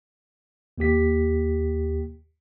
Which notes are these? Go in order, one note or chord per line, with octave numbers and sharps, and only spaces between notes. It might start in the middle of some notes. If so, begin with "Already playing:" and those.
D#2 A#3 G4 B6